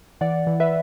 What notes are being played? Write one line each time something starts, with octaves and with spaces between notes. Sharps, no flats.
E3 D5 F#5
E3
B4 E5